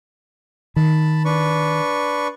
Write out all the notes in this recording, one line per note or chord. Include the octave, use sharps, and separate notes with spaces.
D#3 A5 B5
D4 B4 C#6